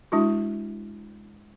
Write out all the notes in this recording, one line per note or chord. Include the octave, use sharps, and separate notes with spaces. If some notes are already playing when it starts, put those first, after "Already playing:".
G#3 D4 E4 F#4